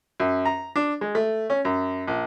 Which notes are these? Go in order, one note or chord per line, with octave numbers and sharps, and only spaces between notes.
F#2
A#5
D4
G#3
A3
C#4
F#2
A#1